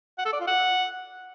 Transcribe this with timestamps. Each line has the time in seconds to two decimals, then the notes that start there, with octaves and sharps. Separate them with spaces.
0.18 F#5
0.26 A4
0.33 D5
0.40 F4
0.47 F#5